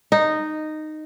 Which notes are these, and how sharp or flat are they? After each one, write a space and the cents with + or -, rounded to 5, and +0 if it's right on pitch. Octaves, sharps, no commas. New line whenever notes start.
D#4 -10